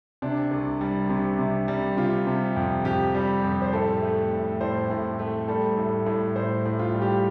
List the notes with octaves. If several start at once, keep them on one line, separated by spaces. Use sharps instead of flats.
C3 D4
C2
G3
C3
C3
G3
C3 F4
C3
F2
F2 G4
G3
F2
C5
A2 A4
A3
A2
A2 C5
A2
A3
G3 A4
A2
A2
A2 C5
A2
F4
G3
G4